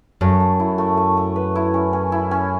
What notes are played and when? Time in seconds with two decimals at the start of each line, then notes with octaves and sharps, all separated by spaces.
0.21 F#2 A3
0.40 A3
0.60 E4
0.78 A3
0.97 A3
1.17 A3
1.36 B4
1.56 E4
1.74 C#4
1.93 C#4
2.12 E4
2.31 C#4